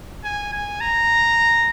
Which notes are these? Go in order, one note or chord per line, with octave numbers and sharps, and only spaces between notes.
G#5
G#5
A#5